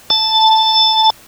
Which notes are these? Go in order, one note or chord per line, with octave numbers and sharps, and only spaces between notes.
A5